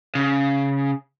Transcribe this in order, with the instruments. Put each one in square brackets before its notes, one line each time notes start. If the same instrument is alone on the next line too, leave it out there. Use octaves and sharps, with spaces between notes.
[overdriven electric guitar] C#3